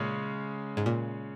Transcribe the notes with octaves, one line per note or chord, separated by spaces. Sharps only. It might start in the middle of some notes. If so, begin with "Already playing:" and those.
Already playing: A#2 C#3 G#3 C#4
G#2
A#2